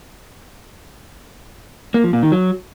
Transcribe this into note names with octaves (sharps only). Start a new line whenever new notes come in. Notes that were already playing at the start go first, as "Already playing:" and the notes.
A#3
F3
A#2
D#3
F#3